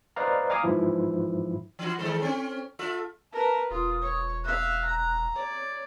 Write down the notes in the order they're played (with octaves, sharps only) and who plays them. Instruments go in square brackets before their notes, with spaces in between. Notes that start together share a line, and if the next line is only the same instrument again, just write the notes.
[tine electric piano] B4 C5 D5 D#5 F5 A#5
F5 G#5 A#5 D6 D#6
G#2 E3 F3 E4
[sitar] E3 E4 F#4
D#3 G#3 A4
C4 C#4
F4 A4 E5
[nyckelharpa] A#4 B4 [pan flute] A5
[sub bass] E1 [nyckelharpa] F4 [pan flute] D#6
[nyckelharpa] C#5
[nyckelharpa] E5 F5 [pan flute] F#6
[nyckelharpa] A#5
[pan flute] C#5 [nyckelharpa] D5